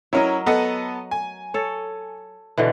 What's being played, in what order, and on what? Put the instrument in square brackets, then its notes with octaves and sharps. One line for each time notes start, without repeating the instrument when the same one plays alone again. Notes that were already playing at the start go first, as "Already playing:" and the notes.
[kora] F#3 A#4 D#5 [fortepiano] C#4 E4
[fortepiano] B3 A4 D#5 [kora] F#5
[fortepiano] G#5
[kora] A4 C#5
B2 D3 E3